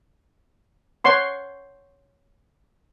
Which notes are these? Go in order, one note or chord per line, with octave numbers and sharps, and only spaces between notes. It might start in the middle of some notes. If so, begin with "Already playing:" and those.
C#5 F#5 C6 C#6